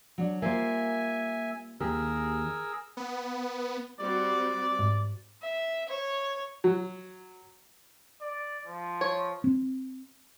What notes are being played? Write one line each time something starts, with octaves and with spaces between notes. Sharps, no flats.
F#3 D4
G3 A#3 F4 C5 E5 G#5
D#2 G4 G#4 A#4 E6
B3
G3 C4 F#4 D5
G#2
E5
C#5
F#3
D5
F3
C#5
C4